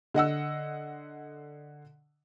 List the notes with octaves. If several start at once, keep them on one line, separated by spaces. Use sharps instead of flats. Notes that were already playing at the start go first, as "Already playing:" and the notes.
D3 D#5 F#5 E6